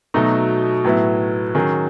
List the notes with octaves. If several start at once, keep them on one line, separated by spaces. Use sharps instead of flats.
B2 F#3 A3 D#4
A2 F#3 B3 E4
D#3 F#3 C#4 G#4